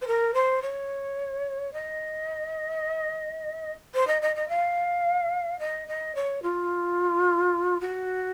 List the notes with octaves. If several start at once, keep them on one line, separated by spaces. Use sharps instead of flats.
C5
A#4
C5
C#5
D#5
C5
D#5
D#5
D#5
F5
D#5
D#5
C#5
F4
F#4